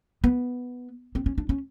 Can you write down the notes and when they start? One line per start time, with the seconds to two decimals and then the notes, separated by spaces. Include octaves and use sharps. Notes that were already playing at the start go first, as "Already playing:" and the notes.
0.24 B3
1.15 C4
1.26 C#4
1.38 D4
1.49 C#4